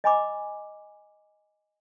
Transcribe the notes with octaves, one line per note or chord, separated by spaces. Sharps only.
D#5 G#5 B5 D6